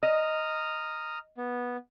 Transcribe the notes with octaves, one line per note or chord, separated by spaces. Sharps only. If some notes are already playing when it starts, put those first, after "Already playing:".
D#5 A#5 D#6 F6
B3